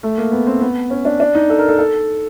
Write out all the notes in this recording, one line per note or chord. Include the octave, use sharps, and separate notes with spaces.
A3
A#3
B3
C4
B3
C#4
D4
D4
D#4
A4
A#4
A4
A4